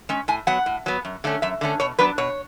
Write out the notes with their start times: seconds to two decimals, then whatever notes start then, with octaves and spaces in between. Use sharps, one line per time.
0.09 G#3 C#4
0.28 A2 G#5
0.47 F#3 B3 F#5
0.66 A2
0.86 F#3 B3
1.05 F#2
1.24 D3 A3 C#4
1.42 F#2 E5
1.61 D3 A3 C#4
1.80 B2 C#5
1.99 F#3 B3 D4 B4
2.18 B2 C#5